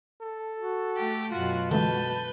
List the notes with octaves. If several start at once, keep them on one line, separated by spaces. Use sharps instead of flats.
A4
F#4
A3 G4
F#2 B2 F4 F#4
D3 E3 G#3 B4 A5 G6